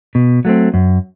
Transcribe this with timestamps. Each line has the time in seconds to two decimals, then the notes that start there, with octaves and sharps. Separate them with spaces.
0.15 B2
0.45 F#3 A3 C4
0.74 F#2